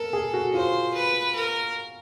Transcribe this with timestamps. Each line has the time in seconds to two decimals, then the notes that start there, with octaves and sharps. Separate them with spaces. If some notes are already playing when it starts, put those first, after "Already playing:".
Already playing: A4 A#4
0.13 G#4
0.34 F#4
0.54 F4 C5
0.94 B4
1.36 A#4